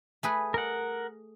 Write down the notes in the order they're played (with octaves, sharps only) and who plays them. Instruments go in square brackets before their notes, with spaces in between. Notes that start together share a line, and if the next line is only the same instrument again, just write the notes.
[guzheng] A3 G#4 B4
[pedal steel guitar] A#4 F#5